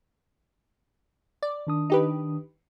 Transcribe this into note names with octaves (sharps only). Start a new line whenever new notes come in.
D5
D#3 D4 D#6
D#4 G4 B4